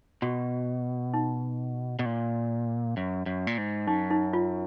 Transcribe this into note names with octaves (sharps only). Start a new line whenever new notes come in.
B2 F#4
D#4
B2
A#2
F#2
F#2
A#2
G#2
F#2 D#4
D#4
F4